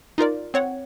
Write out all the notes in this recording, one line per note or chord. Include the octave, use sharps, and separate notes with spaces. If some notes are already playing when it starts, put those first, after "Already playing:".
D#4 F4 A#4 D5
C4 C#5 F#5